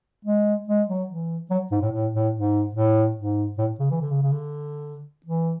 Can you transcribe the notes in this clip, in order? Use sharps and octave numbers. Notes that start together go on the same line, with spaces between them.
G#3
G#3
F#3
E3
F#3
G#2
A2
A2
A2
G#2
A2
G#2
A2
C#3
E3
D3
C#3
C#3
D3
E3